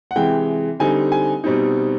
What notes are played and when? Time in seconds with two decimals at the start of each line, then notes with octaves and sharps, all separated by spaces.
0.11 F#5
0.16 C3 E3 G#3 G5
0.79 D3 G3 C4 D#4 G#5
1.12 G#5
1.44 B2 G3 C4 D#4